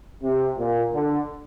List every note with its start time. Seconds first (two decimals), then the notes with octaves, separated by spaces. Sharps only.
0.23 C3
0.58 A#2
0.93 D3